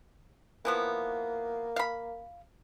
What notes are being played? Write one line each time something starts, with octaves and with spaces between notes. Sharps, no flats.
E3 F3 A#3 B3
F5 B5